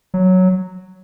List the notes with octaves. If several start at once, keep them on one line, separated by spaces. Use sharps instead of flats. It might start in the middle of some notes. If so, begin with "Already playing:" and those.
F#3